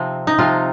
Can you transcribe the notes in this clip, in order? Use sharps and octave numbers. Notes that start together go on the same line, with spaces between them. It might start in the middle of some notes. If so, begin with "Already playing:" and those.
Already playing: C3 F3 C4 D#4
D#4
C3 F3 C4 F4